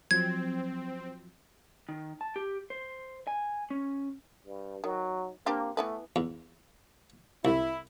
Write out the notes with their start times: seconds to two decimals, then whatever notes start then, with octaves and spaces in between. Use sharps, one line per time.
0.11 F3 F#3 C4 G#6
1.89 D#3
2.21 A5
2.36 G4
2.70 C5
3.27 G#5
3.70 C#4
4.46 G2
4.84 D#3 F#3
5.46 A#3 C4 D4 G4
5.77 E3 A3 B3 B4
6.16 E2
7.45 C2 E4